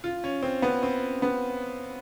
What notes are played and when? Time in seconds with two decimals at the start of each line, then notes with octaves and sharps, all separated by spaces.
0.04 F4
0.24 C#4
0.43 C4
0.62 B3
0.83 C4
1.22 B3